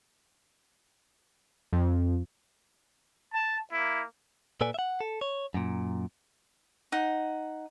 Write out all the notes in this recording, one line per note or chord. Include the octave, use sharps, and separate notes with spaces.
F2
A5
A#3 E4
A#2 A4 B4 D5 G#5
E5 F#5
A4
C#5
F#2 A#2
D#4 F#5